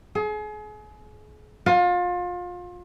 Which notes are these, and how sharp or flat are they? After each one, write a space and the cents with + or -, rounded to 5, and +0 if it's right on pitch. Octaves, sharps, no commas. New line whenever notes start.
G#4 +35
F4 +30